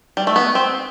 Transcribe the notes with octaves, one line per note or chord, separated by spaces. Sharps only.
G3
A3
B3
C4